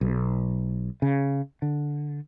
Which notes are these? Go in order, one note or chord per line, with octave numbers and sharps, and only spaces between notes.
B1
C#3
D3